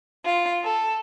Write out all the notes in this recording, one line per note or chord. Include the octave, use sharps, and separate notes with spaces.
F4
A4